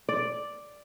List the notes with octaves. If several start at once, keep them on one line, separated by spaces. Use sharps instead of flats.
D5